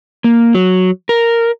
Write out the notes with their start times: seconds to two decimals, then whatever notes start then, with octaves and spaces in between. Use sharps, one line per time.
0.24 A#3
0.54 F#3
1.09 A#4